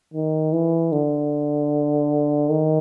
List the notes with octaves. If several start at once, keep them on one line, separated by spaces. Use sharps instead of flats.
D#3
E3
D3
D#3